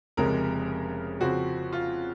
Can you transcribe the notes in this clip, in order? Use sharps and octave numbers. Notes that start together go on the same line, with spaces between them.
F1 F2 C#3 G#3 A#4
F2 C#3 F3 C4 F#4
F4